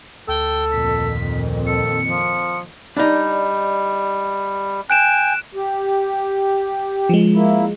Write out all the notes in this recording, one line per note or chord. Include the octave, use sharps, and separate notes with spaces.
D2 A4 G5
F2 A#2 D#3 B6
A4 C#7
F3
G3 D4 D#4
G5 G#5 F#6 D7 E7
G4
F3 G#3
A#3 E4